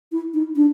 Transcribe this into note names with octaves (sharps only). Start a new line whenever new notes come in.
E4
D#4
D4